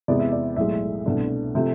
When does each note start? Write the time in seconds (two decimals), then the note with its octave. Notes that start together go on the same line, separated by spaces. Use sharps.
0.08 E2 C3 G#3 B3 D5
0.19 E5
0.32 D5
0.56 B1 A2 G#3 E5
1.06 C2 B2 A3 D4
1.55 C3 F3 A3